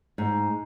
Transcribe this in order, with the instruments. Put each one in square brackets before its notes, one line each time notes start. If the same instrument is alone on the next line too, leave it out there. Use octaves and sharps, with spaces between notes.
[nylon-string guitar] G#2